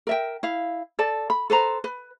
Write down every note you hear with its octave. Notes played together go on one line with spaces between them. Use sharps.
A#4 E5 G5
E4 F5
A4 D5 A5
B5
A4 B4 C5 A#5
B4